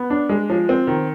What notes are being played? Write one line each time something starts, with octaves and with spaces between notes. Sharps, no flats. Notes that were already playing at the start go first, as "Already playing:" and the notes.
Already playing: B3
D4
G#3
F3
C4
D#3